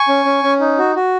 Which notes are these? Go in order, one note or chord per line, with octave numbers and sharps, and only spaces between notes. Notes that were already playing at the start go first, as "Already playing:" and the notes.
Already playing: G#5 C#6
C#4
C#4
C#4
D#4
F#4
F#4